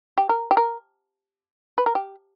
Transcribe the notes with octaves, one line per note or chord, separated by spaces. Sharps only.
G4
A#4
G4
A#4
B4
A#4
G4